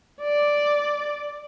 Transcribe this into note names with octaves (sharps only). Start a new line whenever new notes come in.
D5